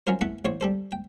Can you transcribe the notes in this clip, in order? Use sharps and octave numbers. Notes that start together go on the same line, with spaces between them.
F#3 C#4 F4 A#4 C5
A3 B3 E4 B4
A1 C5 C#5 C#6
G3 A4 C5
G5